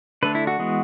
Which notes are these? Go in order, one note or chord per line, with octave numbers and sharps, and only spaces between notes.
D3 A3 D4 B4
E4
F#4
E3 G#3 B3